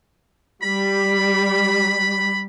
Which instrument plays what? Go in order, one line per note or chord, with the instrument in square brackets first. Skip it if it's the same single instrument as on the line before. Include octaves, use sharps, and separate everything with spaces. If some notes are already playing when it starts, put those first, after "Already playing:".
[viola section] G3 [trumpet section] B5